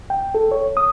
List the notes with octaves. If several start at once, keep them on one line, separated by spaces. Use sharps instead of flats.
G5
A4
C#5
D#6